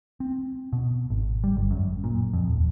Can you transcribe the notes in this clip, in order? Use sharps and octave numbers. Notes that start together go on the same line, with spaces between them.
C4
B2
G#1
G3
G1
F#2
A#2
F2
D#1